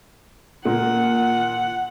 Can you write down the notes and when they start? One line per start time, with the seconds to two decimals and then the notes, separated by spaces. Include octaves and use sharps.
0.65 A#2 A#3 F#5